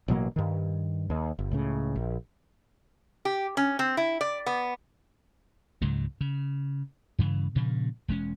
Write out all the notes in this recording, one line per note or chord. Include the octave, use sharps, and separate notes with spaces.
A1 B2 F#3 A#3
G2 D#3
D#2
G1
C#2 A2 C#3
A#1
G4
C#4
C4
E4
D5
B3
C#2 G#2 C#3 F#3
C#3
G2 C#3 E3
G2 A#2 C#3 F3
E1 G#3 C#4